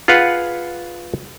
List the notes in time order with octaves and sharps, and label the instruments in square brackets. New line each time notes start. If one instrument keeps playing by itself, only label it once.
[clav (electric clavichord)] F4 G#4 B4 F5 F#5